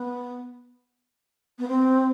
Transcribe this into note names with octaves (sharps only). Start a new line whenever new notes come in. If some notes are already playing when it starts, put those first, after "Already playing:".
Already playing: B3
B3
C4